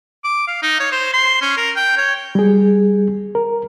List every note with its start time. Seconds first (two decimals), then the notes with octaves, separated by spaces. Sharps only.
0.24 D6
0.48 F5
0.63 D#4
0.80 C#5
0.92 C5
1.14 C6
1.42 C#4
1.57 A#4
1.76 G5
1.98 C#5
2.35 G3 G#4
3.35 A#4